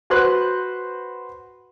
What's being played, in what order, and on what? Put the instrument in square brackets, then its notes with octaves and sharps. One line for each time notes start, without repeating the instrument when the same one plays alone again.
[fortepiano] F#4 B4 C5 C6 F#6